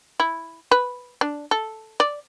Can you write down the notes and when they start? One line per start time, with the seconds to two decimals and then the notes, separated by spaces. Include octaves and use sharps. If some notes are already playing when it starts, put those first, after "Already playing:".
0.20 E4
0.71 B4
1.21 D4
1.51 A4
2.00 D5